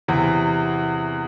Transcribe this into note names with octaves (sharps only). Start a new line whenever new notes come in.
E2 C3 E3